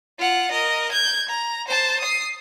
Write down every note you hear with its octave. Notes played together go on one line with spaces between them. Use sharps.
F4 F#5
A#4 D#5
G6 G#6
A#5
C5 A5
D#6 C7